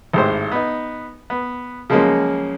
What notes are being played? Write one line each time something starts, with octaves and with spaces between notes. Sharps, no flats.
G#1 A2 G#3 G4 C5
B3 D#4
B3
C#3 F3 F#3 G#3 A#3 C#4